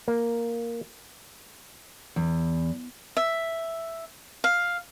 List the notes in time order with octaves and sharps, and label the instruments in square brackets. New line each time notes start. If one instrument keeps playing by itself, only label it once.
[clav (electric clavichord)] A#3
[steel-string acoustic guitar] E2
[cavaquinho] E5
F5